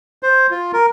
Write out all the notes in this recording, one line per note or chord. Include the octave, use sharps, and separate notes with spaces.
C5
F4
A#4